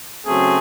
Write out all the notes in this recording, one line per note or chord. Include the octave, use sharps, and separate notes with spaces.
C#3 F#3 A3 C4 G#4